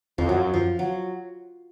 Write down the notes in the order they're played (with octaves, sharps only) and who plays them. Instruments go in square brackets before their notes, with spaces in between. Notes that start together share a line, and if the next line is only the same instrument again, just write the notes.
[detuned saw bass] F2 [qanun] F3
[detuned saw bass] F#2 [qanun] F#3
[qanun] F3
F#3